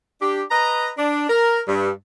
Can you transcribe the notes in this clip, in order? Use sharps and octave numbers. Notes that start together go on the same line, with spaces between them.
D4 G4
B4 D#5 A#5
D4
A#4
G2